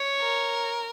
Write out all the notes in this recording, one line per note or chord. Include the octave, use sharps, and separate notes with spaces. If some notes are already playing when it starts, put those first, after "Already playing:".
Already playing: C#5
A#4